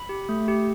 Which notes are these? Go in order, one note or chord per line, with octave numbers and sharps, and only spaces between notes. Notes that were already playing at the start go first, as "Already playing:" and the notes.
Already playing: B5
G4
A3
G4